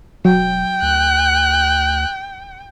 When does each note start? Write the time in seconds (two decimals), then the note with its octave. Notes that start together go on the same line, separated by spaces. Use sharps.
0.25 E1 F#3 G5
0.82 D2 F#6